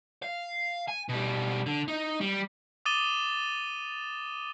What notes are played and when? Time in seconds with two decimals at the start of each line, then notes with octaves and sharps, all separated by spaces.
0.23 F5
0.88 G#5
1.09 B2 G3
1.66 D3
1.88 D#4
2.21 G3
2.86 D6 D#6 A6 D#7 E7 G7